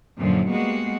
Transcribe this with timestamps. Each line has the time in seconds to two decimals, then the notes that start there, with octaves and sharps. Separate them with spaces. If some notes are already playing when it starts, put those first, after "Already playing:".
0.18 F#2 A#2 D3 F3 F#3
0.49 G3 G#3 A#3 B3 F#4